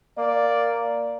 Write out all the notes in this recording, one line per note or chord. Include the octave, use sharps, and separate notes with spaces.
A#3 D5